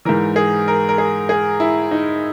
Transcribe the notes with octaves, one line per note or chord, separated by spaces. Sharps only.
G#2 E3 A#4
G#4
A#4
A#4
G#4
G#4
E4
D#4